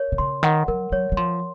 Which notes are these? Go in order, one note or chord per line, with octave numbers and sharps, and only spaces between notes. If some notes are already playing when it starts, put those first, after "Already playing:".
Already playing: A#4 C#5
C3
C#3 C6
D#3 F#5
F#3 A#4
F#3 C#5
F#3
F3 C6